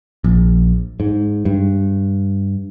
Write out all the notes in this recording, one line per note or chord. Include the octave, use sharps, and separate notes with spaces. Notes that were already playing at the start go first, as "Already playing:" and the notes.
A#1
G#2
G2